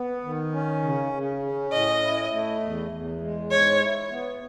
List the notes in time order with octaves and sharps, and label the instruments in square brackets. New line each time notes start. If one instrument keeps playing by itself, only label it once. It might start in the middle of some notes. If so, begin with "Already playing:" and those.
Already playing: [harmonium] B3
D#3
C#4
C#3
C#3
C#4
[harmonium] A2 [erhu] D#5
[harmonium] E4
A3
E2
E2
G#3
[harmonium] G#2 [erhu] C#5
[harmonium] E4
B3